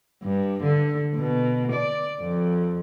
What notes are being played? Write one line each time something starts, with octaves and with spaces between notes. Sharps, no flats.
G2
D3
B2
D5
F2